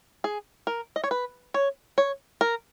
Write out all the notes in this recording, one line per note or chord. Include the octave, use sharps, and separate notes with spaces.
G#4
A#4
D#5
C#5
B4
C#5
C#5
A#4